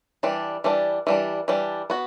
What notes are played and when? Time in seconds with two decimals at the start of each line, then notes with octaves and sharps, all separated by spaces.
0.23 E3 G3 D4
0.64 E3 G3 D4
1.07 E3 G3 D4
1.48 E3 G3 D4
1.90 B3 F#4